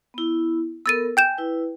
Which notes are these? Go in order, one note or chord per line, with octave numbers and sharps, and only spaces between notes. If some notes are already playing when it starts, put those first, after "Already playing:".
B3 E4
B3 A4 A#4 E6 A6 D#7
G5 G#5 G6 E7
E4 B4